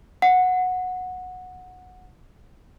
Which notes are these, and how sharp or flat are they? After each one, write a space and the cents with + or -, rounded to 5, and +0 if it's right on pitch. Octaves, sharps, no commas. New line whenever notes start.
F#5 -15